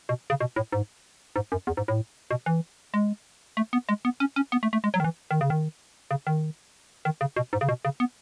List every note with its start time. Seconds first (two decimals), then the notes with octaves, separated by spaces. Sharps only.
0.09 B2
0.30 C#3
0.40 B2
0.56 A2
0.72 G#2
1.36 G#2
1.52 F#2
1.67 E2
1.77 G#2
1.88 A2
2.31 B2
2.46 E3
2.94 G#3
3.57 A3
3.73 B3
3.89 G#3
4.05 B3
4.20 C#4
4.36 C#4
4.52 B3
4.63 A3
4.73 A3
4.84 G#3
4.94 F#3
5.00 D#3
5.04 E3
5.31 D#3
5.41 C#3
5.50 D#3
6.11 C#3
6.27 D#3
7.05 D#3
7.21 C#3
7.36 B2
7.53 G#2
7.61 C#3
7.69 B2
7.85 C#3
8.00 B3